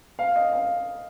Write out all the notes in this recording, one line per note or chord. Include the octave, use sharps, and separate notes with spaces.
F5
D#5
F5